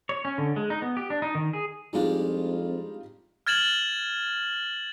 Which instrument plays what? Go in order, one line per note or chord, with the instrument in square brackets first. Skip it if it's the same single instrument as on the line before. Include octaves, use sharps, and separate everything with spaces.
[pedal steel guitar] C#5
C#4
D3
G#3
D#4
B3
G4
D4
D#4
D#3
G#4
[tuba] F2 [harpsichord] G3 G#3 D4 [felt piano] D#4 F4 G4
[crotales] F6 G#6 A6 E7 F#7